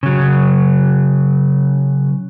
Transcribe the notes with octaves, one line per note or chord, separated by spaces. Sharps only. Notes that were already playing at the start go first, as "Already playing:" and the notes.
C#3 F#3